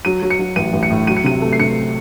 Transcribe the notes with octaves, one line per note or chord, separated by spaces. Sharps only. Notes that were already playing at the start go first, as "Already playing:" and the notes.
F#3 D#7
F#3
C#7
F#3
A1 D#7
A1
C#7
A2
F#3 D#7
C#7
C3 D#7
A3
C7
C3 C#7